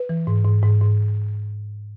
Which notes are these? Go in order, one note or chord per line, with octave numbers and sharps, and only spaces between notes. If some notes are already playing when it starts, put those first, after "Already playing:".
Already playing: B4
E3
G#2
G#2
G#2
G#2